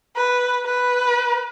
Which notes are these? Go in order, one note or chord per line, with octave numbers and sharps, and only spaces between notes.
B4
B4